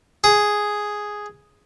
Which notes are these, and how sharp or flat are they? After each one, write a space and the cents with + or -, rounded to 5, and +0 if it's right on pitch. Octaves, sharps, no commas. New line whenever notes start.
G#4 +0